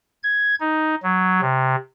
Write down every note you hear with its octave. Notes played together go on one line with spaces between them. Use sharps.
G#6
D#4
F#3
C3